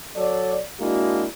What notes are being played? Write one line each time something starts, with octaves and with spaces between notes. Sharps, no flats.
F#3 A4 C#5 D5
G#3 A#3 D4 E4 F#4